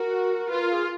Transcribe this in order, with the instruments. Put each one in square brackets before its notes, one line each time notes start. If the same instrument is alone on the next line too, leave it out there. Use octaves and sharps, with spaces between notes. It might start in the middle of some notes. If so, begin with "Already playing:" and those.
Already playing: [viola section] F#4 [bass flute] A#4
[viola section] F4 [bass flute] B4
[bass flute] A#4
G#4